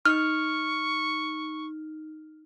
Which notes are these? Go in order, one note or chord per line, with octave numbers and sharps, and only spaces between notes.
D#4 C#6 F6